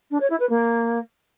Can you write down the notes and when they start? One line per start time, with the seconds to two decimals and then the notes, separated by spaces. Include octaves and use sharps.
0.11 D4
0.20 C#5
0.30 E4
0.40 B4
0.49 A#3